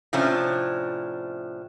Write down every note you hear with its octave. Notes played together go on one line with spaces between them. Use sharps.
A2 C3 F3 C#4 D4